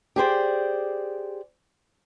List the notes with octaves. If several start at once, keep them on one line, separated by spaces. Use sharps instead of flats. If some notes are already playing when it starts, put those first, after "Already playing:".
G4 G#4 C5 D5